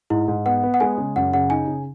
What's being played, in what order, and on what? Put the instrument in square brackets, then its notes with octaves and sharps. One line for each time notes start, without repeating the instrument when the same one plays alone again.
[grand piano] G#2 [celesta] E4
[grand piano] G#2
[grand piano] B3 [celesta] F#5
[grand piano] B3
[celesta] F#5
[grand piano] G#3 [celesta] G#5
[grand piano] C#3
[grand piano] F#2 [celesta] F#5
[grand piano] C#3 [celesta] F#5
[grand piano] D#4 [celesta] G#5
[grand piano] C#3